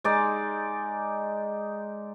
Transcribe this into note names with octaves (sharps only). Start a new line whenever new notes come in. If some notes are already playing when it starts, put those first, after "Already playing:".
G#3 D#4 D5